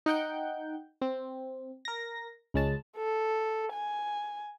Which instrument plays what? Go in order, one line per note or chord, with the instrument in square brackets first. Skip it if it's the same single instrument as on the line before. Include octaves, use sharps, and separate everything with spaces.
[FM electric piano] D#4 F#5 G5 G6
C4
A#4 A#6
C#2 G#3 C#4 A5
[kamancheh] A4
G#5